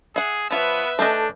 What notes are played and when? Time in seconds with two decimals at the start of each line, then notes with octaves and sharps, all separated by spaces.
0.16 G#4 E5 F#5
0.51 F3 B3 F4 B4 C#5 E5
0.99 A3 C#4 D4 A4 D#5 A5 G6